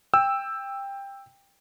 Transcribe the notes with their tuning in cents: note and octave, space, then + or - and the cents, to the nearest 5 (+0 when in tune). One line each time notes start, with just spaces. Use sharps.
G5 +15 E6 +0